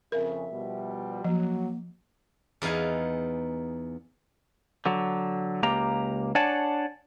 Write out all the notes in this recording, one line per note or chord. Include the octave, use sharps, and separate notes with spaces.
F2 C#3 A#4 E5
B2 F3 G3
F3 F#3 A#3
E2 B3 D#4 F5 G#5
D3 F#3
C#2 A#3 G4 A#5
D4 C#5 D5 F#5 G#5 A5